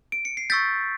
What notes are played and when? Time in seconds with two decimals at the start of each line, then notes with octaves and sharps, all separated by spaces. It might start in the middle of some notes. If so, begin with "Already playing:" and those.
0.12 D7
0.25 C#7
0.37 C7
0.50 C#6 E6 G6 A6 B6